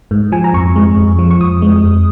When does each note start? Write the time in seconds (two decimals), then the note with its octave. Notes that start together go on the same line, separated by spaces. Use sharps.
0.11 G#2
0.32 F3 G#5
0.44 A#5
0.54 F2 C#6
0.76 G#3
0.97 F2
1.19 F3
1.31 C#6
1.40 F2 D#6
1.62 G#3
1.84 F2